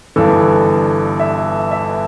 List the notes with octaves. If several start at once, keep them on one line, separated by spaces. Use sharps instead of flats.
G1 G2 E3 A4
E5
E5